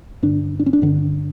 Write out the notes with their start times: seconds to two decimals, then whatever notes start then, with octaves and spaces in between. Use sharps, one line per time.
0.23 G2 D3 D4
0.59 D4
0.66 C#4
0.73 D4
0.82 G2 D3